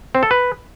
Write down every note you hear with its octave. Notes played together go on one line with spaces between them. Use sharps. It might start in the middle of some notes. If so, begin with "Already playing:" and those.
C4
A4
B4